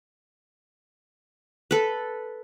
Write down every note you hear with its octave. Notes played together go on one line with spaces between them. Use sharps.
A4 B4